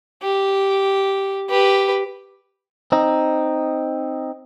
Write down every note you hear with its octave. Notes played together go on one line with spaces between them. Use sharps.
G4
G4 B4
C4 D#4